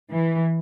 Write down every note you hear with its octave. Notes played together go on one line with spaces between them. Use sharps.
E3